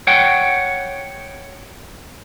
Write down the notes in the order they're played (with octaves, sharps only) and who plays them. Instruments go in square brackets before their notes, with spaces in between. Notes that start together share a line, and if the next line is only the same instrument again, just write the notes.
[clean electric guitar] C#5 F#5 G5